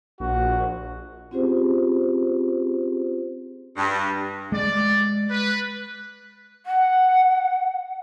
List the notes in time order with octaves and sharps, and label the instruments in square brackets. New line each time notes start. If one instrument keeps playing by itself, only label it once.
[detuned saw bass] A#1 [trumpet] F#4
[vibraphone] C4 C#4 F4 G4 G#4 C5
[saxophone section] G2
[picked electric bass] G#3 [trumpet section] D5
[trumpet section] B4
[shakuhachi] F#5